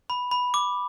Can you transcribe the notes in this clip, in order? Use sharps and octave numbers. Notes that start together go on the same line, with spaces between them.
B5
B5
D6